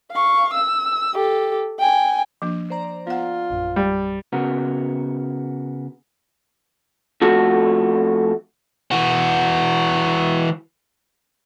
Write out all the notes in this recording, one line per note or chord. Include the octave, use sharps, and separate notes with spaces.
F5 C#6
E6
G4 A4
G5 G#5
F3 A#3 D4
C5 D5 A#5
B3 F4 F#5
A#1 F#2
G3
C#3 B3 F#4 A#4
F2 A3 F#4
E3 F#4